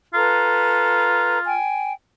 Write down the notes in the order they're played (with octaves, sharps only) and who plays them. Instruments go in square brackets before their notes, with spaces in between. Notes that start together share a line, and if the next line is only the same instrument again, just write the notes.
[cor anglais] F4 [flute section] A4 B4 A#5
[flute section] G5 G#5